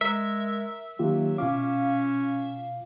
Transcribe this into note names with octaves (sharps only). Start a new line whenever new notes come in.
G#3 A#4 E5
D#3 F#3 A#3 F4 G4
B2 C#4 F4 F5 D6